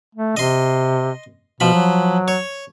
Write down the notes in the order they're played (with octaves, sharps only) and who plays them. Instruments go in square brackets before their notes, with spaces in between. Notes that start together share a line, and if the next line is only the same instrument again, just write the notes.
[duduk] A3
[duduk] C3 [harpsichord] D#5 C6
[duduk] B2 [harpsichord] F3 B5
[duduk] F#3
[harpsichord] C#5